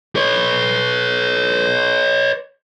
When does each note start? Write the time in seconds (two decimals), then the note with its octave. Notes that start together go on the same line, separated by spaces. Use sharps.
0.16 B4 C#5